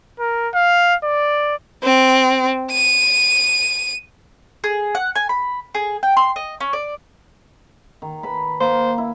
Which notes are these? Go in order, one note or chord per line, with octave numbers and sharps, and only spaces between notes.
A#4
F5
D5
C4
D#7
G#4
F#5
G#5
B5
G#4
G5
C6
D#5
C#4
D5
D#3
B4 A5 B5
A#3 C5
E4